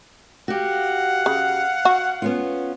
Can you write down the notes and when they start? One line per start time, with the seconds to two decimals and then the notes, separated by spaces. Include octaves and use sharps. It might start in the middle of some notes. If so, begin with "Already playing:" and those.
0.48 F#4 G4 F5 F#5
1.26 C#3
1.85 F#4
2.22 B3 C#4 F4